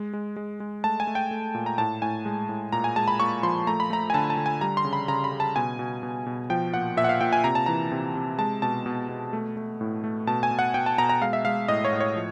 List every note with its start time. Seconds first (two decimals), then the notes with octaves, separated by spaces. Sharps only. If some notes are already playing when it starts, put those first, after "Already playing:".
Already playing: G#3
0.13 G#3
0.36 G#3
0.60 G#3
0.84 A3 A5
1.00 G#5
1.07 A3
1.15 G5
1.31 A3
1.55 A#2
1.66 A#5
1.78 A2 A5
2.02 A2 G#5
2.25 G#3
2.49 A2
2.72 A#2 A#5
2.84 G#5
2.96 G#3 A5
3.08 B5
3.20 A#2 C#6
3.43 F3 C6
3.67 A3 A#5
3.80 B5
3.90 A3 A#5
4.10 G#5
4.14 D3 A5
4.30 A5
4.37 D3
4.46 G#5
4.61 G3 A#5
4.77 C6
4.85 C#3
4.93 B5
5.08 C#3 A#5
5.24 B5
5.32 C#3
5.40 A5
5.56 B2 G#5
5.79 B2
6.03 B2
6.26 B2
6.50 F3 G5
6.74 A#2 F#5
6.97 A#2 E5
7.04 F#5
7.09 F5
7.21 A#2 G5
7.33 G#5
7.44 C3 A#5
7.55 A5
7.66 E3 A#5
7.92 C3
8.15 C3
8.38 G#3 A5
8.62 B2 A5
8.86 B2
9.09 B2
9.33 A3
9.57 A3
9.81 A2
10.04 A3
10.27 B2 A5
10.43 G#5
10.51 B2
10.59 F#5
10.74 B2 G5
10.86 A5
10.98 B2 A#5
11.09 A#5
11.21 G#3 F5
11.33 E5
11.45 G#3 F5
11.68 A2 D#5
11.85 C#5
11.93 A2
12.01 C#5
12.16 F3